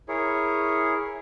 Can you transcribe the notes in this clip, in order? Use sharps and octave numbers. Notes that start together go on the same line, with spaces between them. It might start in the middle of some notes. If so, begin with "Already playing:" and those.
E4 G#4 A#4 C#5